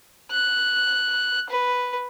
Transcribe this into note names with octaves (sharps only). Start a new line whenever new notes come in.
F#6
B4